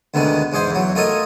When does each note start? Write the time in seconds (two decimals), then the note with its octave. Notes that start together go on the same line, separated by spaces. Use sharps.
0.14 D2 B2 D3 D#3 G#3
0.52 E2 G#2 G#4 C5 C6
0.71 E2 F#3
0.95 A3 F4 A4 A#4 C#5 D#5